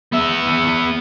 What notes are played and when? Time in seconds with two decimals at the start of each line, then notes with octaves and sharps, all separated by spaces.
0.12 B3 E5